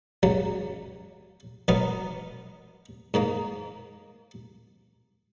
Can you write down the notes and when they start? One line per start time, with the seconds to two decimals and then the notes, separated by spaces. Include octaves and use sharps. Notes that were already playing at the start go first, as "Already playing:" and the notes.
0.23 C#2 C#3 F#3
1.68 B2 F#3 B3 D#4 A#4
3.14 G#2 D#3 A#3